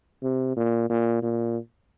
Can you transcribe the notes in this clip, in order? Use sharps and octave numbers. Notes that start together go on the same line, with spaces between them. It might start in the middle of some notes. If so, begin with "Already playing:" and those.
C3
A#2
A#2
A#2